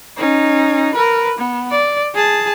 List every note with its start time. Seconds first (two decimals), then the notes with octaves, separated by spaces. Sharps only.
0.17 C#4 D#4
0.94 A#4 B4
1.39 B3
1.71 D5
2.15 G#4 A5